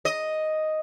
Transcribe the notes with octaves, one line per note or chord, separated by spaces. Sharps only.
D#5